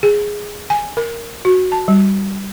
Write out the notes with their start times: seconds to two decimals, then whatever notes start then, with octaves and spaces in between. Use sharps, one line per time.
0.03 G#4
0.70 G#5
0.97 A#4
1.45 F#4
1.72 A5
1.88 G3